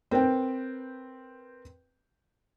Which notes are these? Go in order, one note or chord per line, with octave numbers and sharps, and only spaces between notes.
C4 A#4 B4 G5